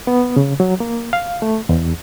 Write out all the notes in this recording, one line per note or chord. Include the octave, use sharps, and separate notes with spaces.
B3
C#3
F#3
A#3
F5
A3
E2